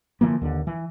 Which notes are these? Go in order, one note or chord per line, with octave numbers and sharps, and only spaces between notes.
D3 E3 F3 A#3
D#2 D3
E3